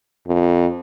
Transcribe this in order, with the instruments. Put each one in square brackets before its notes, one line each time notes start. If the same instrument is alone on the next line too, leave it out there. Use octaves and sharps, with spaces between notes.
[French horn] F2